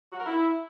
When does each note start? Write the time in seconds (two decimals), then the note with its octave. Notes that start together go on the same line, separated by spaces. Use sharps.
0.12 F#4
0.19 A#4
0.26 E4